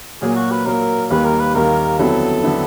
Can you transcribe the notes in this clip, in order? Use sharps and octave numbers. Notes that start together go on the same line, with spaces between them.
A#2 F#3 A#3 G#4
F#4
B4
A#2 F#3 A#3 A#4
D#2 D#3 G3 A#3 B4
A#4
B4
D#2 D#3 G3 A#3 A#4
F2 D3 F#3 B3 E4 A4
D3 F#3 B3 E4